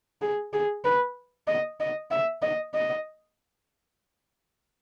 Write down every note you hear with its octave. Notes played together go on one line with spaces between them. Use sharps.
G#4
G#4
B4
D#5
D#5
E5
D#5
D#5